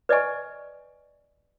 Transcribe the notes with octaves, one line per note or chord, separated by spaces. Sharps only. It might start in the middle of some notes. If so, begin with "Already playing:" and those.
B4 D5 D#5 G#5 C#6